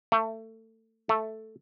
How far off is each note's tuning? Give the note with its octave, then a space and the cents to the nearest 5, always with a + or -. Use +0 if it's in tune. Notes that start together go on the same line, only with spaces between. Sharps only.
A3 +25
A3 +0